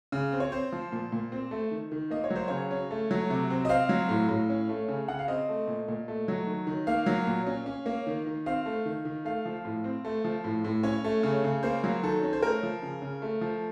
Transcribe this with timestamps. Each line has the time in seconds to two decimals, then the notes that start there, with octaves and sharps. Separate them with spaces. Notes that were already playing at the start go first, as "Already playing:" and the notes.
0.12 C#3
0.32 C4
0.40 C#5
0.52 C4 C5
0.72 F3
0.92 A#2
1.12 A#2
1.32 C4
1.51 A3
1.71 D#3
1.92 D#3
2.11 A#3 D#5
2.24 C#5
2.30 F#3
2.36 C5
2.48 C#3 C#5
2.71 C#4
2.91 A3
3.11 F#3
3.30 C3
3.50 C4
3.65 D#5
3.69 C4 F5
3.89 F#3
4.09 A2
4.29 A2
4.50 C#4
4.69 A3
4.88 C#3
5.08 C#3 F#5
5.19 F5
5.28 C4 D#5
5.49 A3
5.67 A#2
5.88 A#2
6.08 A3
6.28 F#3
6.47 D#3
6.67 D#3
6.87 A#3 F5
7.06 F#3
7.27 A#2
7.47 C#4
7.66 C#4
7.86 A#3
8.07 D#3
8.27 D#3
8.46 C4 F5
8.66 A3
8.86 D#3
9.05 D#3
9.25 A3 F5
9.46 F3
9.65 A2
9.84 C4
10.05 A3
10.24 F3
10.44 A2
10.65 A2
10.83 C#4 C#5
11.04 A3
11.23 C#3
11.44 C#3
11.63 A#3 C5
11.84 F#3
12.03 D#3 A4
12.23 C#4
12.33 C5
12.42 A3 A#4
12.63 F3
12.82 C#3
13.02 C#3
13.22 A3
13.41 F3